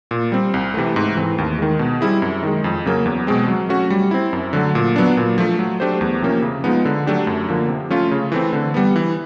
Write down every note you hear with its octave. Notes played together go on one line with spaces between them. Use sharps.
A#2
G3 C4
C2
C3 E3 A3
G#2
E3 A3 C4
D#2
D#3 G#3
B2
G3 C4 E4 G#4
F#2
D#3 G#3
F2
C#3 F#3 A#3 C#4
E2
B2 G#3 C4
F#3
A3 C#4 F#4
G3
C4 E4
F#2
D3 F#3 A3
A#2
F#3 B3 D4
A#2
F3 A3
F#3
A3 D4 G4 C5
E2
C3 F3 A#3 C#4
C#3
F3 G#3 B3 D#4
D3
F#3 A3 D4 G4
F#2
D3 F3 A#3
C3
F3 A3 C#4 F4
C#3
E3 A3 C4
D3
G3 B3
E3